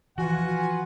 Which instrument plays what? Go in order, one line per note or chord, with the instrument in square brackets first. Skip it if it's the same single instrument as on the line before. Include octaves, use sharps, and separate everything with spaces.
[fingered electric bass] E3 F3 [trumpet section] F4 B4 F#5 [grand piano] F#4 [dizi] G#5